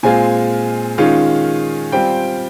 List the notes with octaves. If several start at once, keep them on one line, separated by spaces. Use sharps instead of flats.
A#2 G#3 C4 F4 G#5
D#3 G#3 C#4 F4
G3 C4 F4 G5